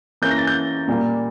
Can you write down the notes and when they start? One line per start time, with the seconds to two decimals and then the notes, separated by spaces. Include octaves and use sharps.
0.22 E3 A#3 C#4 G6
0.31 A#6
0.38 A6
0.47 G6
0.88 A#2 G3 A#3